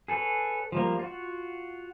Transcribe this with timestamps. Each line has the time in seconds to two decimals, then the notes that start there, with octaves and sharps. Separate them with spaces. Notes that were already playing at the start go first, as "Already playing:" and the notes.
0.08 G#4 A4 B4 C#5
0.72 F3 G3 A#3
0.99 F4 F#4